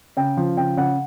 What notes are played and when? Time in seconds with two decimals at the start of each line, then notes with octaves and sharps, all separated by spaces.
0.17 C#3 G5
0.37 F3
0.57 C#3 G5
0.77 C#3 F#5